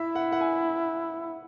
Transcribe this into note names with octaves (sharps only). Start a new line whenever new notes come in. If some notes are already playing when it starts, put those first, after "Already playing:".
Already playing: E4 E5
F#5
F#5
G#5